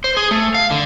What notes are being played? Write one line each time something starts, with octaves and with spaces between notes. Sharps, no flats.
C5
G#4
A3
F5
D3